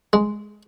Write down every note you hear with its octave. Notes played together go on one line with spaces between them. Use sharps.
G#3